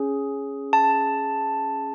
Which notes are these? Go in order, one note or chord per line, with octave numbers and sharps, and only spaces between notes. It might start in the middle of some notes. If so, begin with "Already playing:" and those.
Already playing: C#4 G#4
A5